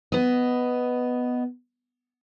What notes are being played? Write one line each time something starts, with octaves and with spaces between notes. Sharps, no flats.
B3 D#5